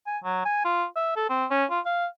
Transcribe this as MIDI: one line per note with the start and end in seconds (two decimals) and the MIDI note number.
0.07 0.18 80
0.24 0.44 54
0.45 0.61 80
0.65 0.85 65
0.96 1.13 76
1.16 1.26 69
1.29 1.45 60
1.51 1.65 61
1.70 1.80 65
1.86 2.06 77